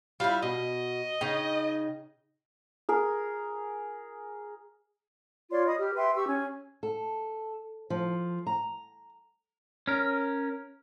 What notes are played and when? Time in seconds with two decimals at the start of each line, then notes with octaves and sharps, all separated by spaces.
0.20 G3 E4 F4
0.42 B2 D#5
1.21 C#3 D#4 G5
2.89 G#4 A#4
5.51 F4 C#5 D5 C6
5.66 D#5 B5 D#6
5.79 G4 F6
5.96 B4 E5 G5 C6
6.15 G4 C#6 E6
6.28 C#4 G#5
6.83 A4
7.90 F3
8.47 A#5
9.87 C#4 A#4